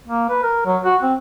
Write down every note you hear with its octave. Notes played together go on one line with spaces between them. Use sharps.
A#3
B4
A#4
F#3
F#4
C4